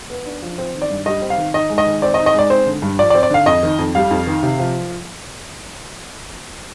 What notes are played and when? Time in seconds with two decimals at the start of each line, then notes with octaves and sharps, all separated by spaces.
0.10 B3
0.26 D4
0.42 F3
0.58 C4
0.74 D#3
0.82 D5
0.90 G2
1.06 G3 D#5
1.22 C4
1.30 F5
1.38 D#3
1.54 D#4 D#5
1.70 G#3
1.78 D#5
1.87 D#3
2.02 C4 D5
2.14 D#5
2.19 D#4
2.26 D#5
2.34 G#3 D5
2.50 C4 C5
2.67 D3
2.82 G2
2.99 F3 D5
3.10 D5
3.14 C4
3.23 D5
3.30 D3 F5
3.46 F2 D#5
3.63 D#3
3.79 F2
3.95 G3 F5
4.11 F2
4.27 D#3
4.43 C3
4.59 F3